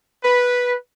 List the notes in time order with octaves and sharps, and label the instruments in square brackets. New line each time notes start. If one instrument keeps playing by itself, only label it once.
[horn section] B4